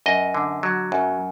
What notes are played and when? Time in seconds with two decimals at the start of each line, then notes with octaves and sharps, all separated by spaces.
0.06 F#2 D#5
0.34 D3
0.63 F#3
0.92 F#2